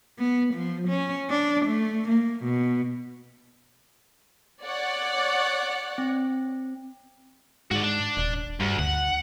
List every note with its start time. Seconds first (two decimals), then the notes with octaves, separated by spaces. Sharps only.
0.19 B3
0.54 F3
0.89 C#4
1.30 D4
1.66 A3
2.09 A#3
2.44 B2
4.64 C#5 D5 F#5
5.98 C4
7.71 G#2 F#4 D5
7.83 D4
8.17 D#1
8.60 D2 G2
8.79 D2 F#5